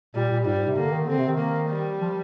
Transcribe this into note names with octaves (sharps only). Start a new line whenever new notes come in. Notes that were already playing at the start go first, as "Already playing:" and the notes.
A#2 G3
A#2
G#2 G3
G#2
C3
D3 A#3
D#3
D3 C4
C3
D#3
A#3
G3
F3